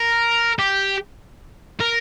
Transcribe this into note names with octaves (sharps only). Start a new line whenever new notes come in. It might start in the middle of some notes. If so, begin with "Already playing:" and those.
Already playing: A#4
G4
A#4